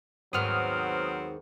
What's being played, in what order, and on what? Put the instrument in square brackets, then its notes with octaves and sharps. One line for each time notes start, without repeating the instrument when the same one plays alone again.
[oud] D#2 G#2 D#3 [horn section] F#3 B3 C4 [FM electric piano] D#6 F6